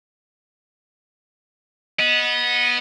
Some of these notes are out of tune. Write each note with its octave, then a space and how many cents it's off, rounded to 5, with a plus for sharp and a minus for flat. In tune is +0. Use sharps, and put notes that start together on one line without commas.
B3 -20 D#5 +0